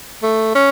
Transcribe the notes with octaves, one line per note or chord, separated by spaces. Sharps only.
A3
C#4